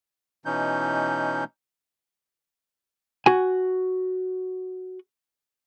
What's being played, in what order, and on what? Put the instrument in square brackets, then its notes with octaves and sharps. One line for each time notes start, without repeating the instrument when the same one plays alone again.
[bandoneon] B2 E3 C#4 D#4 G6
[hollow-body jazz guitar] F#4 G#5